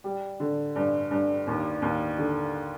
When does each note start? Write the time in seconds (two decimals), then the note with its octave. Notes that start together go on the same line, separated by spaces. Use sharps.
0.04 G3
0.40 D3
0.76 G2
1.11 G2
1.47 D#2
1.82 D#2
2.18 D3